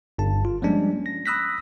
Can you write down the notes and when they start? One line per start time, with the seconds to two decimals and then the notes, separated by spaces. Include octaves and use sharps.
0.18 G1 G2 A5
0.45 F4
0.62 F3 G3 G#3 A#3 C#4 D4
1.06 A#6
1.26 B5 D#6 E6 F#6 A#6 B6